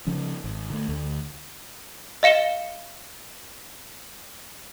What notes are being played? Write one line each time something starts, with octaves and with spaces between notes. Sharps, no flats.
C#3 F3 C#4
G#1
D3 A3
D2 D3
D#5 F5 C#7 E7 G7